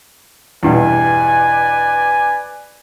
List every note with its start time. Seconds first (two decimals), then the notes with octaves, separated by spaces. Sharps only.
0.63 E2 G2 B2 B4 D5 G#5